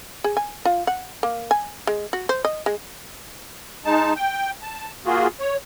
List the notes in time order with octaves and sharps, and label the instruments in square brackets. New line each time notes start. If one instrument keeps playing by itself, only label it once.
[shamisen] G#4
G#5
F4
F#5
A#3
G#5
G#3
F#4
C5
D#5
G#3
[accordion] G#3 D#4 A5
G5
A5
A#3 F4 F#4 G#4
C#5